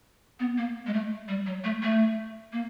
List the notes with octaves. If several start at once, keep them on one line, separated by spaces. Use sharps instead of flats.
B3
A#3
G#3
A3
G3
F#3
A3
A3
A#3